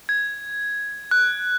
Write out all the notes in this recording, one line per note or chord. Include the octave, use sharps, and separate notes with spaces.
G#6
F#6